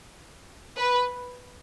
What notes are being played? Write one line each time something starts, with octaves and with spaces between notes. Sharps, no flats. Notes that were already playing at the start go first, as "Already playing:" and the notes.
B4